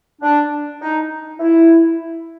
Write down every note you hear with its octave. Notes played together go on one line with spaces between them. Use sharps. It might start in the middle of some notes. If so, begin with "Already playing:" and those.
D4
D#4
E4